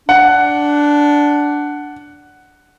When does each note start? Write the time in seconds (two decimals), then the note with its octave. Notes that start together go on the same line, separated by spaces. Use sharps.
0.09 D4 F#5